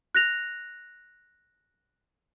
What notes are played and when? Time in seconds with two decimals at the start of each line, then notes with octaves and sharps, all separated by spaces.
0.15 F#6 A#6 F7